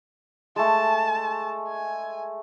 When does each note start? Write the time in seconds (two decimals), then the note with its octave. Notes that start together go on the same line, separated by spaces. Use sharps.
0.56 G#3 A3 A5
1.68 G#5